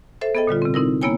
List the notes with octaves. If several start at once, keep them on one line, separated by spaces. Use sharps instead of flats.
A4 C5 E5
B3 G#4 A4 D#5 G5
A#2 D3 G3 F4
C3 C4
C4 D#4 E4 A#4
A#3 B3 E4 C#5 G5 G#5